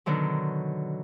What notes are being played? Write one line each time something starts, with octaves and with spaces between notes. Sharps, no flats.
B2 D3 D#3 F#3